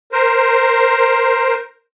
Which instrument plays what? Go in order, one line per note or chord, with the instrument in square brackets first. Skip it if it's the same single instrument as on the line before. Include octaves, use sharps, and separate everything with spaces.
[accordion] A#4 C5